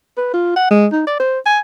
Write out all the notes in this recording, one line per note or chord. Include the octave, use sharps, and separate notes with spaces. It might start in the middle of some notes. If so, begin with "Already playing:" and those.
B4
F4
F#5
G#3
D#4
D5
C5
G#5